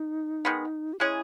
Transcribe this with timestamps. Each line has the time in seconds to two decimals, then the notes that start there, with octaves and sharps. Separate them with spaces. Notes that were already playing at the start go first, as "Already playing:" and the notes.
Already playing: D#4
0.45 D#3 G#3 B3
0.93 G4
1.00 G#3 C#4 E4 G#4